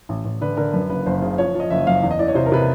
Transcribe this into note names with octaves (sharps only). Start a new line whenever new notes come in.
A1
A1
D3 B4
D3 A#4
F#2 B4
F#1 B4
F#1 C5
C#3
F3 C#5
F3
D#5
F#1 E5
F#2 F5
E2
D#5
E3 D5
C#5
C3 C5
A#4
C3 B4